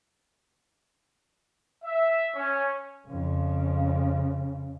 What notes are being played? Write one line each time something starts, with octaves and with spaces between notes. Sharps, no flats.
E5
C#4
F2 C#3